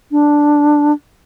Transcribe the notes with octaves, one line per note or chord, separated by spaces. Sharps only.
D4